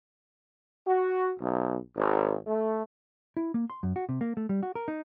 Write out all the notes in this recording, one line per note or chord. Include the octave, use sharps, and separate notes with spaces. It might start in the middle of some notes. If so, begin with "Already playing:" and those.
F#4
B1
G#1
A3
E4
A#3
C6
F#2
F#4
C3
A#3
A3
G3
F#4
A#4
D#4